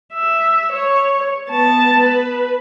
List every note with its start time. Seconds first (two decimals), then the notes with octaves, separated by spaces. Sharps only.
0.14 E5
0.72 C#5
1.49 B3 A5
2.03 B4